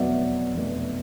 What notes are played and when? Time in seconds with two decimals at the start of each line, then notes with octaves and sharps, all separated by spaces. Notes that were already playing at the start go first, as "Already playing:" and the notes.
Already playing: F1 E2 B2 F#3 D5 E5
0.55 F1 E2 B2 F#3